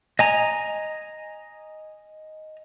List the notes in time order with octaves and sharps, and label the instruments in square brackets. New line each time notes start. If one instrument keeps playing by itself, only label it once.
[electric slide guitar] D#5 G#5 A#5